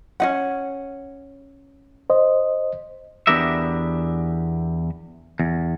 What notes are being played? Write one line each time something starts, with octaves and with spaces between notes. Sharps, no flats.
C#4 D#4 F#5
C5 D#5
E2 B3 D4 G4 A#4 E5
E2